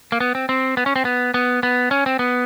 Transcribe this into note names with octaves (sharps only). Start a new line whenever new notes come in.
A#3
B3
C4
C4
B3
C#4
C4
B3
B3
B3
C#4
C4
B3